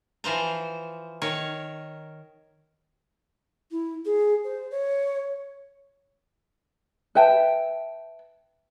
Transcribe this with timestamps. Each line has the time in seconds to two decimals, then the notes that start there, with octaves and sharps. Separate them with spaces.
0.24 E3 F3 C5 A#5
1.22 D#3 A#4 C#5
3.71 E4
4.05 G#4
4.44 C5
4.71 C#5
7.15 B4 E5 G5 A5